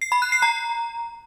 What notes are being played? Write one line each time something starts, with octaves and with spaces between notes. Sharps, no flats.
C7
B5
F#6
C7
A#5